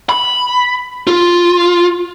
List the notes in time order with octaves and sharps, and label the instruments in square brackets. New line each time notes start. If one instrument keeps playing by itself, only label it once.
[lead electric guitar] B5
F4